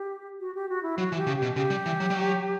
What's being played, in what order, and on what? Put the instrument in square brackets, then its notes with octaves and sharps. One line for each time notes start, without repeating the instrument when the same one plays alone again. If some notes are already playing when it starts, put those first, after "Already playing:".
Already playing: [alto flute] G4
F#4
G4
F#4
E4
[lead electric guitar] F#3 [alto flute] F#4
[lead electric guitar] E3
[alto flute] G4
[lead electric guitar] C#3
[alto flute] G4
[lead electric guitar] B2
[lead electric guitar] C#3 [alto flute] G4
[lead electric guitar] G3
E3
F#3
G3
F#3